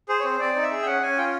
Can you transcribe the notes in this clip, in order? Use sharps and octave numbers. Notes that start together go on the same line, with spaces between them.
G#4 C5
C#5
C4 C5
C4 D5
D#4
E5
G#4
G5
C#4 F#5
C#4 G#5
F4 G5